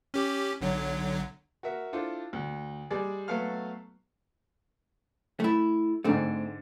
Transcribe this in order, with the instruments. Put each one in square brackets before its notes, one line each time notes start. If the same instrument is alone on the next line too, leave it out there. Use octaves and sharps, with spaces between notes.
[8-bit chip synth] C#4 G4
B1 D3 F#3
[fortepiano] F#4 A#4 E5
D4 E4 F4 A4 C5
D2
G3 G#3 G#4 D5
F#3 A3 B3 A4 F5 F6
[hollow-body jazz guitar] A3 E4
[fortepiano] G#2 D3 [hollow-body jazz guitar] A3 C4